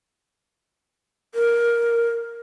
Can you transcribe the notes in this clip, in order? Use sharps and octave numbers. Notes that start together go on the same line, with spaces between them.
A#4